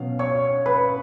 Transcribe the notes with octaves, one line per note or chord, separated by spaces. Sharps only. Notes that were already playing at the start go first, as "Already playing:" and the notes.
Already playing: B2 F#3 C#4 F5
C#5 C#6
B4 B5